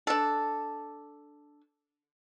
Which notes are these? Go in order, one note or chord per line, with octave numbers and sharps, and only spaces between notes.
D4 A4